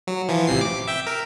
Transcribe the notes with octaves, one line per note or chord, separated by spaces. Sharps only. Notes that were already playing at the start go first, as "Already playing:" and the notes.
F#3
E3 F3
A1 C3 C7
D6
E5 G5
A#4